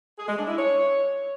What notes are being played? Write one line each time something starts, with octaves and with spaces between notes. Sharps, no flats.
G#4
G#3
D4
E4
C#5